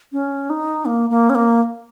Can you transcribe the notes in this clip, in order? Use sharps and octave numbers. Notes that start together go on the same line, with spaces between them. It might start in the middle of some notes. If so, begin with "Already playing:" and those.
C#4
D#4
A#3
A#3
C#4
A#3